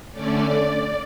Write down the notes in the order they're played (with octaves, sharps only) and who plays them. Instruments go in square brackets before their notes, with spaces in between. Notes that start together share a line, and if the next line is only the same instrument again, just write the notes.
[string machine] D3 A3 C#4 D5